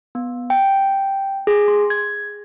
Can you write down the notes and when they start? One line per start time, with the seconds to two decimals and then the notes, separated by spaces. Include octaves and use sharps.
0.15 B3
0.50 G5
1.47 G#4
1.68 C6
1.90 G#6